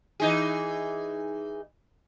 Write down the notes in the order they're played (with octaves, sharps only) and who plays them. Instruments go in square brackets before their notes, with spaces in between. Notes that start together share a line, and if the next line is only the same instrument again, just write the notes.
[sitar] E3 D#4 G#4